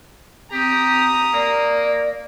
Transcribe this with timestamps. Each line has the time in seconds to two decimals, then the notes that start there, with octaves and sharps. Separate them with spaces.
0.53 C4 G4 A#5 D#6
1.34 A#3 D5